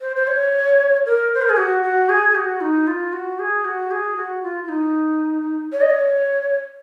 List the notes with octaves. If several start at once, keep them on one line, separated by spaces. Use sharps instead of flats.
C5
C5
C#5
A#4
C5
A#4
G#4
F#4
F#4
G#4
G#4
F#4
D#4
F4
F#4
G#4
F#4
G#4
F#4
F4
F4
D#4
C#5
D#5
C#5